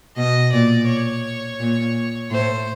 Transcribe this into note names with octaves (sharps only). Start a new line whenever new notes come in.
B2 D#5
A#2 D5
C#5
A#2
A2 C5